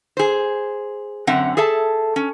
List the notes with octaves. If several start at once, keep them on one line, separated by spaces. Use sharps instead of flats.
G#4 C5
F#2 D3 C4 E5 F#5
G#4 A4 E5 A5
C#4